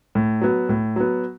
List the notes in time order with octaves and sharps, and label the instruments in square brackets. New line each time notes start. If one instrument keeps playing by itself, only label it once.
[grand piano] A2
F#3 B3
A2
F#3 B3